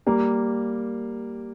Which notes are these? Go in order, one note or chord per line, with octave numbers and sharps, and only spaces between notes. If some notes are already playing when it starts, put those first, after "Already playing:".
G3 A#3